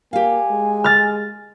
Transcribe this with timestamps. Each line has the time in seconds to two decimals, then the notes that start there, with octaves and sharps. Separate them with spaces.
0.13 A#3 G4 F5 G#5
0.51 G#3
0.84 F6 A6